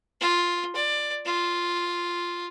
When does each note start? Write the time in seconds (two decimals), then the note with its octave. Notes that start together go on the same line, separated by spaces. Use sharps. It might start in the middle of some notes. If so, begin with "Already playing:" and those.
0.21 F4
0.75 D5
1.25 F4